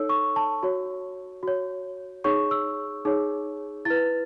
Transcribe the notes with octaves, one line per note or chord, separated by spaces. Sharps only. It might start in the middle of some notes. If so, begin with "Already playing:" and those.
Already playing: D#4 A4 C#5 E6
C#6
A5
F#4 C#5
F#4 C#5
D#4 G#4 C#5 C#6
E6
D#4 G#4 C#5
E4 B4 A6